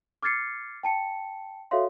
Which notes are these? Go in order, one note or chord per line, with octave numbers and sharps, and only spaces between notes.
D6 F6 G#6 A6 C7 C#7
G5 A5 C#7
F#4 A4 C#5 E5 F5 C6